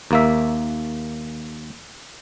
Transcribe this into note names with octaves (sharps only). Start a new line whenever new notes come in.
D#2 A#3 E5